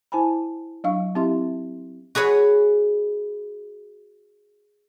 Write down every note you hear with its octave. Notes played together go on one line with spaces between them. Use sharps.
E4 C5 G#5 A5 B5
F#3 D4 F5 C#6
C4 E4 G4 E5 C6
F#4 G#4 B4 C#5